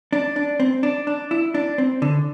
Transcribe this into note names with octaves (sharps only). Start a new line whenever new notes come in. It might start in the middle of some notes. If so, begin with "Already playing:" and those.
D4
D4
C4
D4
D4
E4
D4
C4
D3